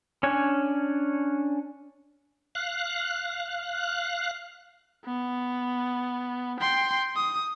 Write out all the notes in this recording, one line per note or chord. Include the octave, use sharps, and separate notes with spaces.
C#4 D4 C#5 G#5
F5 F#6
B3
G5 C6
D#6